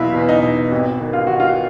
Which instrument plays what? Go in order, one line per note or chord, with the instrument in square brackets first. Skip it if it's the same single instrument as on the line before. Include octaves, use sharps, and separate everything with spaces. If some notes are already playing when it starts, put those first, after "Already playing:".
Already playing: [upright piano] E2 B2 F#3 E4 F4
E2
D#4
B2
G#1
D#3
F4
D#3 F#4
F4